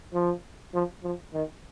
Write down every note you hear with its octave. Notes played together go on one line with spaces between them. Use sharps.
F3
F3
F3
D#3